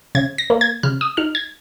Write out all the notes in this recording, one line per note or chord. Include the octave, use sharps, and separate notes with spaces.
C#3 G#6
A#6
A#3
G#6
C#3 F6
D#6
D#4 F6
G#6